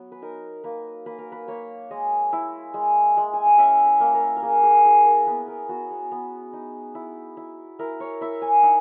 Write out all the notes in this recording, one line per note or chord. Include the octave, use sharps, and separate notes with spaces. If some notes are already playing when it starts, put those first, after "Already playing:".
Already playing: F#3 B3
B4
D#4 A#4
A#3 B4
A#3 B4
A#4
B4
A#3 C#5
G#3 D#5
E4
G#3
G#3
G#5
F#5
C#4 E5
B4
A#3
A#4
A#4
A#3 G#4
G#4
E4 G#4
A#4
B3 B4
A#4
B3 F#4
G#4
B3
D#4
E4
E4
E4 A#4
C#5
E4 E5
G#5
D#4 F#5